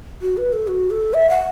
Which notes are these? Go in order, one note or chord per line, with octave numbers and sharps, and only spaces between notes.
F#4
B4
A4
F#4
A4
E5
F#5